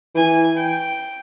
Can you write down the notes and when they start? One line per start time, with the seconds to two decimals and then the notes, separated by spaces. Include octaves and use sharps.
0.15 E3 G#5
0.57 G5